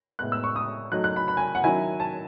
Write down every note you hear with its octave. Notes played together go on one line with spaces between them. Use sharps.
A2 G#3 B3 F#6
E6
C#6
D#6
F#3 A3 D#4 F#6
F#6
B5
B5
G#5
F#5
D#3 F#3 C#4 E4 G#5
A5